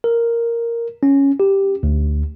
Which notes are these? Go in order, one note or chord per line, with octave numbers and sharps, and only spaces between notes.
A#4
C#4
G4
D2